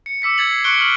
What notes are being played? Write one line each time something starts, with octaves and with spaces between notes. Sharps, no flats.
C#7
D6 E6 B6 C#7
G#6 A6 F#7
C7
C#6 F#6 C#7 D7 G7
F6 F#7